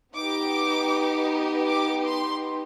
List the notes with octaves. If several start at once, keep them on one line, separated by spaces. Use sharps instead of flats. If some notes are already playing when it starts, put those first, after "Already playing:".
B3 D#4 G4 D6
D6
C6